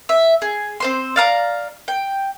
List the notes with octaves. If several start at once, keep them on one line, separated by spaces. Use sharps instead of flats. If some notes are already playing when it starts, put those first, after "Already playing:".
E5
G#4
C4 C5 C6
D5 F5 A#5
G5